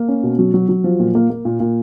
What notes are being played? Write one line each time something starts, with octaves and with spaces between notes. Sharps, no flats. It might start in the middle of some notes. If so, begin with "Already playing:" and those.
Already playing: A#3
C#4
B2
F#3
F#3
F#3
F3
A#2
A#3
A#3
A#2
A#2